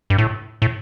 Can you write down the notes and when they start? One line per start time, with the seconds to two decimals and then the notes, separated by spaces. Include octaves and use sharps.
0.10 G2
0.18 A2
0.62 A2